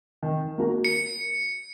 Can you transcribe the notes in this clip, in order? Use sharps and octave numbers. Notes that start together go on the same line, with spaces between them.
D#3
A#3 F#4 A#4
C#7